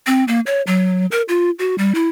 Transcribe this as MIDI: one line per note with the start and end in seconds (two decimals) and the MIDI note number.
0.07 0.24 60
0.28 0.40 58
0.46 0.62 73
0.67 1.06 54
1.11 1.22 70
1.29 1.51 65
1.59 1.77 66
1.78 1.94 55
1.95 2.09 64